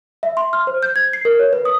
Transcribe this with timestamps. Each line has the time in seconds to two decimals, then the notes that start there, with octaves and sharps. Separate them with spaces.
0.23 E5
0.37 C6
0.53 F6
0.67 C5
0.83 G6
0.96 G#6
1.13 C7
1.25 A#4
1.39 C#5
1.53 B4
1.65 D#6